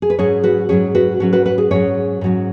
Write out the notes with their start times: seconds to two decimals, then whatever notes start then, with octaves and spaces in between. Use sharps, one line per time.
0.02 G#4
0.10 B4
0.18 G#2 F#3 C#4 G#4 C#5
0.44 F#4 B4
0.69 G#2 F#3 C#4 G#4 C#5
0.95 F#4 B4
1.20 G#2 F#3 C#4 F#4
1.33 F#4 B4
1.45 F#4 B4
1.58 G#4
1.71 G#2 F#3 C#4 G#4 C#5
2.21 G#2 F#3 C#4